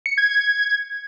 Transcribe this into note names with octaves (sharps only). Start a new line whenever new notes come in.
C#7
G#6
G#6